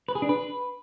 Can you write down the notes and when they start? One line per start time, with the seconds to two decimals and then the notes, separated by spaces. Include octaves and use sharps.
0.08 B4
0.15 G#4
0.22 D4
0.29 B4